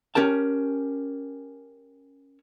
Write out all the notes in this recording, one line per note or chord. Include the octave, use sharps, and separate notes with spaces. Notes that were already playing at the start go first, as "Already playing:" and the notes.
C#4 G4 A#4 A5